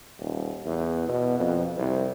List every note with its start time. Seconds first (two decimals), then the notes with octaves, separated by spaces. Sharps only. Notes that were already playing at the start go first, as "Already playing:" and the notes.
0.20 D#1
0.66 E2
1.09 B2
1.40 F2
1.78 C2